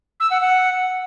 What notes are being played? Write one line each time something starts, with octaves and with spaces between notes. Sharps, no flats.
E6
F#5
F#5